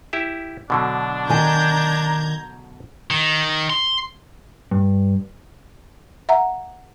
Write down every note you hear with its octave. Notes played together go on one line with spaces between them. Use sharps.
E4 G4 E5
B2 D3 F#3 D4
D#3 G#5 A#5 G6 G#6
D#3
C6
G2
E5 F#5 A#5